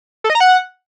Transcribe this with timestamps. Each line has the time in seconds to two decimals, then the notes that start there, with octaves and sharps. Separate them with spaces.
0.24 A4
0.30 D#5
0.35 A#5
0.40 F#5